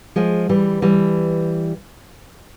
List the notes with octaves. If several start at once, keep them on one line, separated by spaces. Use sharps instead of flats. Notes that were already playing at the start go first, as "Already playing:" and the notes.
F3 G#3
E3 G3
E3 G3